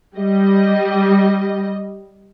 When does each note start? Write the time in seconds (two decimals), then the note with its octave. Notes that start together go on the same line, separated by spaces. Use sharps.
0.16 G3 D#5